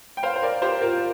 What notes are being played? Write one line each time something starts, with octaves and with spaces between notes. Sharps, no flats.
G5
C5 F5
C5
A#4 D5
G4 C5
F4 A#4